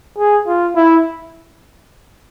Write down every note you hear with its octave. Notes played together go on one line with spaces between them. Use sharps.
G#4
F4
E4